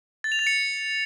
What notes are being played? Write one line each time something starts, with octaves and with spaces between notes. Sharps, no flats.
A6
F7
A6
C#7